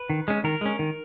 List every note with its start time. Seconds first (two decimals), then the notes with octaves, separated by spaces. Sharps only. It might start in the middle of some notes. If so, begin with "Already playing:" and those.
Already playing: B4
0.10 D#3
0.28 G#3 C#4
0.44 D#3 A#4
0.61 G#3 C#4
0.79 D#3